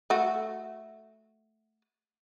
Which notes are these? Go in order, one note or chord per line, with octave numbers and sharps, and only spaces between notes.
A3 F#4